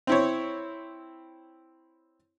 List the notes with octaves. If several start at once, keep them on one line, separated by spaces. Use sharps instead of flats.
C4 E4 C#5